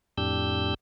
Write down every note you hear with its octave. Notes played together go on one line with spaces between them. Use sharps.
F2 A2 D4 G4 E6 G6